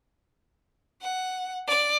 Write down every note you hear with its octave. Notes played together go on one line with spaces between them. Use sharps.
F#5
D5